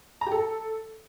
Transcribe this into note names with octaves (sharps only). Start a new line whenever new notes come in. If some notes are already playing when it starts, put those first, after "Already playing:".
A#5
G4
A4